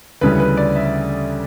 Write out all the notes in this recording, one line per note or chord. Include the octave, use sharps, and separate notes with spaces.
D2 C#3 E3 G3 B4
B4
D5
E5